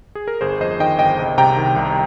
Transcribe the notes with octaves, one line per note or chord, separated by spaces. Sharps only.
G#4
A#4
G1 G#4 C5
F2 C5 D#5
D#3 D#5 G5
G1 D#5 G5
C2
C3 G5 A#5
D#3
C2